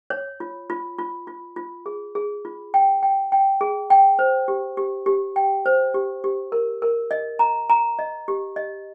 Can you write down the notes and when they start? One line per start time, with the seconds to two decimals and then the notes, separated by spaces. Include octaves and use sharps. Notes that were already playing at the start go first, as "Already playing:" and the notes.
0.10 C#5
0.40 F4
0.70 F4
0.98 F4
1.27 F4
1.56 F4
1.86 G#4
2.15 G#4
2.45 F4
2.74 G5
3.03 G5
3.32 G5
3.61 G#4
3.90 G5
4.19 C5
4.48 G4
4.77 G4
5.06 G4
5.36 G5
5.66 C5
5.94 G4
6.24 G4
6.52 A#4
6.82 A#4
7.11 D#5
7.39 A#5
7.70 A#5
7.99 D#5
8.28 G4
8.56 D#5